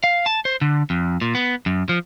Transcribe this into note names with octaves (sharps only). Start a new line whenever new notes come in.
F5
A5
C5
D3
F2
A#2
B3
F#2
F3